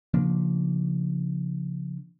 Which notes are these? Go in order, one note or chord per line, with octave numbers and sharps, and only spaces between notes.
C#3 F3 A#3 D4